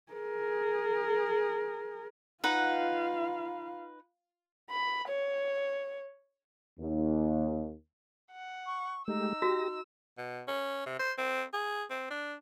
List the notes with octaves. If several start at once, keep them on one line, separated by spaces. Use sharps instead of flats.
G#4 A#4
D#4 F4 B4 F5 F#5
B5
C#5
D#2
F#5
C#6
G#3 A3 D#4 G4 E6
F#4 G4 A#6
B2
C#4
C3
C5
C4
G#4
C4
D4